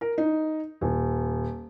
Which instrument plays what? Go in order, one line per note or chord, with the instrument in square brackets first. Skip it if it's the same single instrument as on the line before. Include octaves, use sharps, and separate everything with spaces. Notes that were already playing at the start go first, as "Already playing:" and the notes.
[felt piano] A#4
D#4
D#1